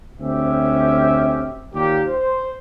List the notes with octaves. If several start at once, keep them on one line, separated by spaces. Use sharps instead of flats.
D2 C4 C#4 G4 E5
D#2 A#2 A#3 G4
C5